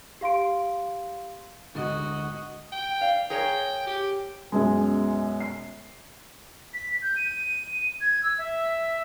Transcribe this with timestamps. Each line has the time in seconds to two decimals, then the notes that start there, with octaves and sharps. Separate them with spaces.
0.21 G4 F5 C6 D7
1.75 D2 G#2 D3 F#4 D#5
2.72 G5
3.01 D5 F5
3.30 G#4 A#4 C#5 G5
3.87 G4
4.52 F#2 B2 G#3
5.40 C7
6.74 B6
7.02 G6
7.16 D#7
8.01 G#6
8.23 E6
8.38 E5